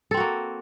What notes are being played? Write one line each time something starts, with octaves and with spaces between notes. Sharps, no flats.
A#3 C4 F#4 A4